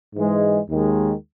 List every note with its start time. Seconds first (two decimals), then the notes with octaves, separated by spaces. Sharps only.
0.15 G#2 E3 G#3
0.69 D#2 D#3 G#3